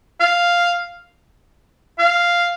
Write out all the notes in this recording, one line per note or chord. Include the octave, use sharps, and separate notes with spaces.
F5
F5